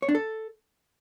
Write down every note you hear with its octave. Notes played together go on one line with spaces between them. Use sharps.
C#5
D4
A4